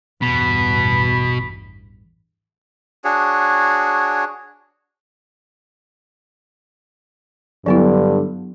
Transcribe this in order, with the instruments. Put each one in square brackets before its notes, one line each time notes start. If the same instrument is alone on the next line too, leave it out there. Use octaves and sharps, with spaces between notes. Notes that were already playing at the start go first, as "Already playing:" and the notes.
[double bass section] A1 E2 G2 [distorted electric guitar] B2 [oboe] B5
[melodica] D4 F#4 G#4 C#5
[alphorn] G2 [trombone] D3 [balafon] F#3 B3 E4